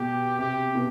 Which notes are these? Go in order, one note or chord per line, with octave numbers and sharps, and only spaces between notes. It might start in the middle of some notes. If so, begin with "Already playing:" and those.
Already playing: B2 G4
C3 G4
B2